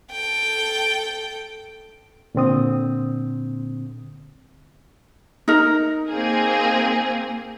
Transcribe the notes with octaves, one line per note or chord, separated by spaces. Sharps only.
A4 G5
A#2 D3 C4 D#6
D#4 A#4
A#3 C4 G#4